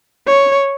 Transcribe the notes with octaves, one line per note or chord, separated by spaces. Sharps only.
C#5